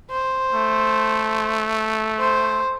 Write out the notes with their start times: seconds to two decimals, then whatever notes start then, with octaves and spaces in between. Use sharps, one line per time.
0.10 C5
0.54 A3
2.19 C5